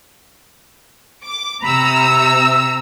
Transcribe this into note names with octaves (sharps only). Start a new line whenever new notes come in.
D6
C3 A#5 B5 E6
E5